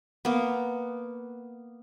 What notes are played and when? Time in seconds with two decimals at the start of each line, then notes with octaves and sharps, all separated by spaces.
0.25 A#3 B3